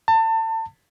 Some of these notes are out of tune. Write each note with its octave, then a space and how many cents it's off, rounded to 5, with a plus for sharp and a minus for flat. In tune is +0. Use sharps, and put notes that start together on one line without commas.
A5 +30